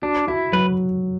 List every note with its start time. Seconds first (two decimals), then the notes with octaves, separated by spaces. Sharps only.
0.02 D4 F#4
0.27 E4 F#4
0.52 F#3 B4